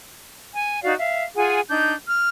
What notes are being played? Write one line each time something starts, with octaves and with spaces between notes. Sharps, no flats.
G#5
D#4 F#4 D5 F5
E5 F5
F4 G#4 F#5 G#5
D4 D#4 G6
F6